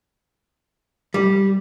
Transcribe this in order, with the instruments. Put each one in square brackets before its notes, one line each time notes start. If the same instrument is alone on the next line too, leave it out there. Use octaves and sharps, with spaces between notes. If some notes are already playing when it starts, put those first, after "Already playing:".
[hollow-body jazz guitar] G3